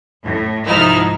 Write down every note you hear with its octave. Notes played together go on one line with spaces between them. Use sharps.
A2
C2 G#2 F3 D#4 E4 F6